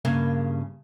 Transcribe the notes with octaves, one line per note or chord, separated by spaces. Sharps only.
G2 C#3 A#3